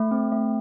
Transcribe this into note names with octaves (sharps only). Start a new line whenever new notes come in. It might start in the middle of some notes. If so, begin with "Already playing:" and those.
Already playing: A3
C4
A3